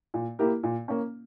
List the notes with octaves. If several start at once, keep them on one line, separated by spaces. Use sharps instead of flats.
A#2
A#3 E4 G4 A#4
A#2
A#3 C#4